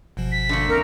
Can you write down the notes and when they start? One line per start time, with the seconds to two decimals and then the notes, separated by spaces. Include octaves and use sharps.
0.17 G1 B2 F3
0.32 B6
0.49 D3 A3 A#3
0.68 D2 C4 A#4 C#7